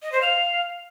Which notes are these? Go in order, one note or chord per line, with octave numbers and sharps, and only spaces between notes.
D#5
C5
F5